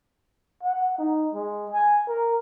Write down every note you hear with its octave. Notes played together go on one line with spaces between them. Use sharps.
F#5
D#4
G#3
G#5
A#4